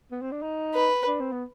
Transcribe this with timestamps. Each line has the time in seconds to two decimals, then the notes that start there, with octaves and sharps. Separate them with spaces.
0.12 B3
0.22 C4
0.32 D4
0.42 D#4
0.75 B4
1.07 D4
1.20 C4
1.32 B3